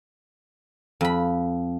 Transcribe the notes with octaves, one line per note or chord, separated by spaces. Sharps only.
F2 B5